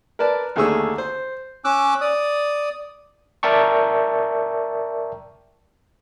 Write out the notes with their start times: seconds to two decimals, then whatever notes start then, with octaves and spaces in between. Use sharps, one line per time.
0.19 A#4 B4 D5 A5
0.56 D#2 D3 A3 G#4 C#6 E6
0.98 C5
1.65 C#4 D6 E6 F#6
2.01 D5 D#6
3.43 A#4 D5 E5 G5 A5 C#6